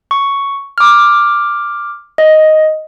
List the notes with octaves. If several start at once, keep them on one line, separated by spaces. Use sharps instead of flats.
C#6
D6 F6
D#5